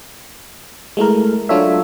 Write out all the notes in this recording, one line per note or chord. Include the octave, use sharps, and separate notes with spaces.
G#3 A3 E4 A#4
F#3 D4 F4 A4 C#5 E5